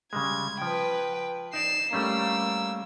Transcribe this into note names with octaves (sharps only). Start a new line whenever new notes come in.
C#3 G3 G#3 G#6
F3 B4 G5
D#4 D5 C7 E7
G3 A3 A#3 C#4 E6